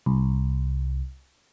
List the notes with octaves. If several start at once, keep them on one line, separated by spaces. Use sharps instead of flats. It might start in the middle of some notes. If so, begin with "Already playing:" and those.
C2